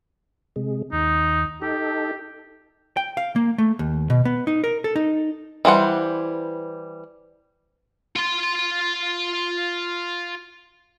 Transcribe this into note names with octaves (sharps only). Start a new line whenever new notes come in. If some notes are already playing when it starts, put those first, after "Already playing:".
C3 G#3
D#2 D#4
D#4 G4 A4
G5
F5
A#3
A3
D#2
B2
B3
D#4
A#4
A4
D#4
E3 G3 C5 F#5
F4 C6